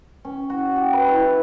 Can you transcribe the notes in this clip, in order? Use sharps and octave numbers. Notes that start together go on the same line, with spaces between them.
C#4
F#4
G4
B4
E4